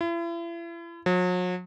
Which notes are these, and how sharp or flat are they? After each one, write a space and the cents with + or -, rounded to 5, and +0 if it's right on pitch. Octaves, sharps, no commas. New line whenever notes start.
E4 +40
F#3 -40